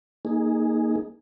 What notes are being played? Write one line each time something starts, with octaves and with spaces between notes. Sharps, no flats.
A#3 D#4 G#4